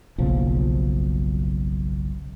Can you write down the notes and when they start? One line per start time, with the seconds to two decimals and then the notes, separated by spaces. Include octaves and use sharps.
0.18 F#1 B1 F#2 F3